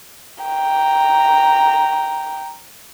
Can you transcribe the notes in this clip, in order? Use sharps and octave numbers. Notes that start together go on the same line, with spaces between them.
G5 A#5